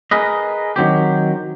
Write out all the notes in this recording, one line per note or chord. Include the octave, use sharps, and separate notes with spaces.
G#4 A#4 B4 D#5
D#3 F#3 C4 G4